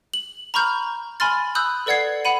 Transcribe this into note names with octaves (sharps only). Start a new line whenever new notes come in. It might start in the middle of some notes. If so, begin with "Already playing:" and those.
F#7
A#5 B5 C#6 F6 G6
G#5 B5 C6 F6 A6
B5 D#6 E6 F#6 G6
A4 B4 D5 F#5 G#6 C7
F#5 B5 D#7